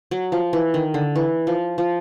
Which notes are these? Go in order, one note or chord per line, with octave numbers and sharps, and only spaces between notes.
F#3
F3
E3
D#3
D3
E3
F3
F3